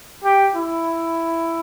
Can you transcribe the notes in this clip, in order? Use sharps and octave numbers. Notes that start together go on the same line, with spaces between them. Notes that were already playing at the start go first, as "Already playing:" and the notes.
G4
E4